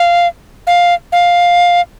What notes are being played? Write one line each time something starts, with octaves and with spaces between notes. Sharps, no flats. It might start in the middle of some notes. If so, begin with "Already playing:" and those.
Already playing: F5
F5
F5